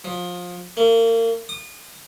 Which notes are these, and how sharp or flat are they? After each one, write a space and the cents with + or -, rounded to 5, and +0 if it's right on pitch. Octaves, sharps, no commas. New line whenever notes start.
F3 +25
A#3 -35
D#6 -35